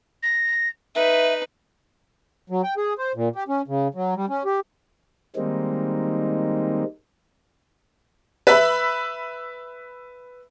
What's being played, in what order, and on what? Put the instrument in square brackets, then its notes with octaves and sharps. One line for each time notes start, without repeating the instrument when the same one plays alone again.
[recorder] A#6
[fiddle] D#4 B4 [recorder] E5
[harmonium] F#3
G5
G#4
C5
A#2
G4
C#4
C#3
F#3
G3
C#4
G4
[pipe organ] D#3 G3 G#3 A#3 C4 D#4
[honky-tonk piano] B4 E5 B5